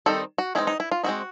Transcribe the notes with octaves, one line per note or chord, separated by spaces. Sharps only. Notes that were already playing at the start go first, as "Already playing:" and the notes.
D#3 G3 C4 D#4 A4
F#4
E3 G#3 C4 D#4 E4
D#4
E4
F4
G#3 C4 D#4 F#4